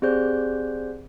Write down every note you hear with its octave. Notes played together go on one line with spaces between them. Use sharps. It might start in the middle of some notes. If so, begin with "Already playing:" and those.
C4 G4 G#4 C5 D5 G6